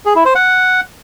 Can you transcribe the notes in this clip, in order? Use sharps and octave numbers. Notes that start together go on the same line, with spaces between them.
G#4
E4
C5
F#5